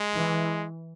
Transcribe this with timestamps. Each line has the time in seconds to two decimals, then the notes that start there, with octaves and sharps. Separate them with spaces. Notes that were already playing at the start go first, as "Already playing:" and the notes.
Already playing: G#3
0.13 E3